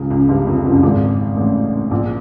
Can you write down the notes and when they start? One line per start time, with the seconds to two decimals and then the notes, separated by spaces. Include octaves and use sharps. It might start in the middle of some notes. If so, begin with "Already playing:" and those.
Already playing: C#2 C#3
0.11 C#2 C#3
0.29 G1 G2
0.47 F2
0.65 F#1 F#2
0.83 G#1 G#2
1.37 A1 A2
1.91 A#1 A#2